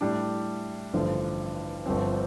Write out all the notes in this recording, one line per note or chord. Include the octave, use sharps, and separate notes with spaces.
A2 G3 D4
A1 G2 D3 F3
G1 G2 F3 C4